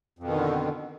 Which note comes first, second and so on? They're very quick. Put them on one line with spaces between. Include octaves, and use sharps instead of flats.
F2 B2 D#3 D3